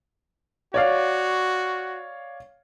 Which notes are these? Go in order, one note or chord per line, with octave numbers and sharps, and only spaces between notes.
F#4 C#5 D5 F5